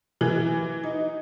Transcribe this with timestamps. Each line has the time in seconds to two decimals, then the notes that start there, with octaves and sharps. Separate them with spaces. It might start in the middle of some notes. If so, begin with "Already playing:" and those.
0.21 E3
0.83 D#4